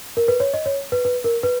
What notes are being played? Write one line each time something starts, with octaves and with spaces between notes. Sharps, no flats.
A#4
B4
C#5
D#5
C#5
B4
B4
A#4
B4